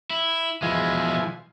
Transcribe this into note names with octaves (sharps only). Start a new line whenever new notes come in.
E4
B2 E3 F3 G#3 G#5